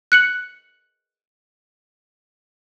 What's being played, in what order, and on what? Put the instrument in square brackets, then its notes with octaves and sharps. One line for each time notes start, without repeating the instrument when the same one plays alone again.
[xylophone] F#6 C#7 F#7